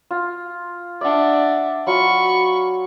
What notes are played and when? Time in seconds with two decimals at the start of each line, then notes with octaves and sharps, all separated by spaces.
0.11 F4
1.01 D4 D5 E5 F#5
1.87 F#3 F4 B5 C#6